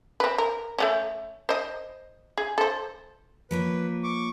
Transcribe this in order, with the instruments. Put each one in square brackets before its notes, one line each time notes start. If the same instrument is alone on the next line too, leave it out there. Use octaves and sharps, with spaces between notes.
[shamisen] C4 B4
A#4
A3 B3 C#4
C5 D#5
G#4
A4 C5
[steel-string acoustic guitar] F3 A#3 C#5 [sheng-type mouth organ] B4
[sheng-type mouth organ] C#6 D6